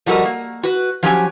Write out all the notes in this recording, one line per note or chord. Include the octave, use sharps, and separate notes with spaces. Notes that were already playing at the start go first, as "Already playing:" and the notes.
F3 G3 F#4 A4 A#4 D#5
A#3
F#4 B4
F3 F#3 C#4 G4 F#5 G#5